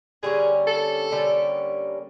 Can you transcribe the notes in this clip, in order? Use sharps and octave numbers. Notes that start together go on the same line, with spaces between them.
D3 G3 A#3 C#4 G#4
A4
D3 G3 A#3 C#4